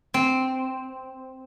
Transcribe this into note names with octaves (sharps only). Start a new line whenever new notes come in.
C4